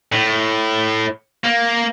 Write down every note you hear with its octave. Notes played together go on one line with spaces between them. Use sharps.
A2
A#3